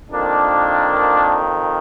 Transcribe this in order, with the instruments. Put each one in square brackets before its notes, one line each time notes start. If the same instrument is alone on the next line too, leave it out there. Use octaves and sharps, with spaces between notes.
[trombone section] F2 D#3 A#3 D4